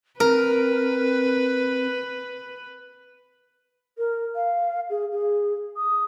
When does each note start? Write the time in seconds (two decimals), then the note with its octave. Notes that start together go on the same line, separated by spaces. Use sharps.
0.20 C4 A#4 B4
3.98 A#4
4.35 F5
4.90 G#4
5.12 G#4
5.77 D#6